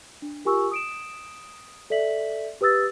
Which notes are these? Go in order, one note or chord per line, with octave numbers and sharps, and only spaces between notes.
D4
F4 G4 A#4 G#5 C#6 E6
D#6 D7 E7
A4 D5 E5 B6 F#7
G4 B4 D#6 E6 A6